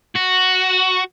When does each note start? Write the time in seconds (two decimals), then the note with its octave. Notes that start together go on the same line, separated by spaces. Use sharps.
0.16 F#4